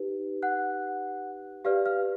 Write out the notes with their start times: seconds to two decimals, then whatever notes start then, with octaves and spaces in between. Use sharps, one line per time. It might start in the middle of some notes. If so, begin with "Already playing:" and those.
Already playing: D#4 G4 B4
0.42 F#5 F#6
1.65 G4 B4 D5 F5 F6
1.86 F5 F6